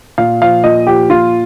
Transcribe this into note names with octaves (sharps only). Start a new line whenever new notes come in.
A#2 F5
F3 F5
A#2 D#5
F3 G4
A#2 F4